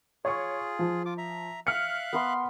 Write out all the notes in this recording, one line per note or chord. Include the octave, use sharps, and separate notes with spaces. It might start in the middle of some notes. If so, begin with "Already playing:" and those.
F4 G#4 C#5 C#6
F3
F4 D6
E5 A#5
E5 F5 F6 F#6 C#7
B3 B4 C6